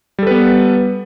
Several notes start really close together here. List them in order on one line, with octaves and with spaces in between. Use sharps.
G3 A4 B4 B3